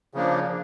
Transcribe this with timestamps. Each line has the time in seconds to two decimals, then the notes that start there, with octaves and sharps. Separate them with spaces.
0.14 C#3 F3 A#3 D4